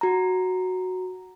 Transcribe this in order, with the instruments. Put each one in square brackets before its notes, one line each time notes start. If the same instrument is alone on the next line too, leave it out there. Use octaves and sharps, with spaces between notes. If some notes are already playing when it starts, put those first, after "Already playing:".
[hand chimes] F#4 A#5